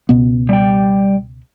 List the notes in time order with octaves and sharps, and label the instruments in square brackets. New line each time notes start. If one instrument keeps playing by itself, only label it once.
[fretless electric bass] C#2 B2 B3
[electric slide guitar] G3 G5